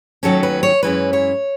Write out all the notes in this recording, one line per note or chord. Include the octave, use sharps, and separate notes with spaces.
D#2 D#3 F#3 A3 C#4 A4
B4
C#5
F#2 E3 G#3 C#4 E4 B4
C#5